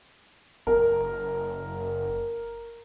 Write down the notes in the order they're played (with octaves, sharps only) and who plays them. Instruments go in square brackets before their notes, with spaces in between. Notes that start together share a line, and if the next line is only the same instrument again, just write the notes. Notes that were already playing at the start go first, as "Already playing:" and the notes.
[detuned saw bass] F#1 [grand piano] A#4